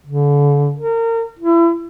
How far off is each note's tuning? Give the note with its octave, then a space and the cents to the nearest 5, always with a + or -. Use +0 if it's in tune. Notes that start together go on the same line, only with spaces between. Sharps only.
D3 -35
A#4 -30
E4 +30